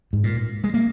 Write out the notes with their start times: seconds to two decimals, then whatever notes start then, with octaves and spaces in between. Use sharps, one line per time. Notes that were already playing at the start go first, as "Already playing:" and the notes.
0.13 G#2
0.24 A#2
0.64 G#3
0.74 A#3